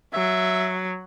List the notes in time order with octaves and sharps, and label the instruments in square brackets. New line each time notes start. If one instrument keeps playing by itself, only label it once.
[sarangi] F#3 [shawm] E5